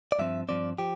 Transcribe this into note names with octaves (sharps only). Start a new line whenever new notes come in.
D5
G2 F3 C4 E5
G2 F3 C4 D5
F3 G4